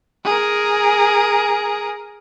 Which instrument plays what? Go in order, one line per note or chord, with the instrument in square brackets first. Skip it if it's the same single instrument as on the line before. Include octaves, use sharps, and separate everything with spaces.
[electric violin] G#4 A#4